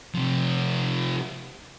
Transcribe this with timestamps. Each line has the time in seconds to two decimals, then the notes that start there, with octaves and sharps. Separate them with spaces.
0.15 C3 F3